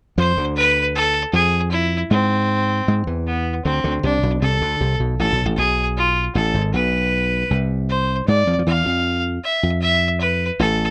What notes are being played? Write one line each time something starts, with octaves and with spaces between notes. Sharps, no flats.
F2 F3 C5
D2 D3
B4
A4
F2 F3 G#4
E4
G#2 G#3 C4
G#2 G#3
E2 E3
B3
D2 D3 C4
D2 D3
C2 C3 D4
B1 B2
C2 C3 A4
D2 D3
C2 C3
B1 B2
A1 A2 A4
B1 B2
A1 A2
B1 B2 G#4
F4
A1 A2 A4
G#1 G#2
B1 B2 B4
C2 C3
C5
G#2 G#3 D5
F2 F3
F3
E2 E3 F5
F2
E5
F2
E5
B4
A1 A2 A4